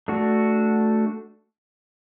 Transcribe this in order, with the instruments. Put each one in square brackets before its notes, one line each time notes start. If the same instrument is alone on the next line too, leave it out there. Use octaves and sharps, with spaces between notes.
[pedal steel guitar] A3 D4 F#4